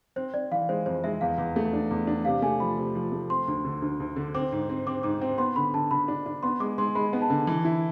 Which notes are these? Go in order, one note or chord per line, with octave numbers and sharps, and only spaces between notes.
C4 C5
C4 D5
E3 F5
G#3 C5
F2 C5
G#3 E5
E2 F5
E2
A3
D4
E2
D4
C3 F5
A3 G#5
F3 B5
C3
F3
A3
C4 C6
D2
D3
D2
D2
D3
C4 D6
G#2
C4
C4 D6
G#2 D6
C4
B3 C6
D3 B5
D3 A5
D3 B5
D4
D4
B3 C6
G#3 D6
G#3 C6
G#3 B5
B3
A5
D3
E3
E4